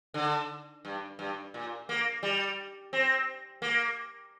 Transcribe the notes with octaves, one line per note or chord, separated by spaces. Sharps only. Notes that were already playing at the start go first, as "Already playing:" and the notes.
D3
G2
G2
A#2
A#3
G3
C4
A#3